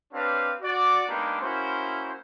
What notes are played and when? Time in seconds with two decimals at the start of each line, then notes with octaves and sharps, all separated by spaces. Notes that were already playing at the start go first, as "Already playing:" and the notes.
0.12 C4 D4 G4 B4 C#5 F5
0.62 F#4 D5
1.09 G#3 A#3 B3 D4 D#4 G4
1.42 A#3 C#4 E4 F#4 C5